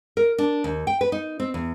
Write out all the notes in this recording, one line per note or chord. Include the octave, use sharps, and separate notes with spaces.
A#4
D4
D#2
G5
B4
D#4
C4
E2